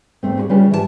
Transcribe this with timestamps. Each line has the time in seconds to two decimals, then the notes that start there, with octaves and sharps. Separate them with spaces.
0.23 E2 G#2 A3 C4
0.37 F#4 G#4 B4 D5
0.49 C#3 G3 C#4 F4 G#4 B4
0.71 G#2 E3 G3 F4 A4 A5